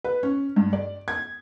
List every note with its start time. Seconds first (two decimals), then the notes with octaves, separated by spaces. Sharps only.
0.04 B4
0.23 C#4
0.56 G2
0.73 D5
1.08 G#6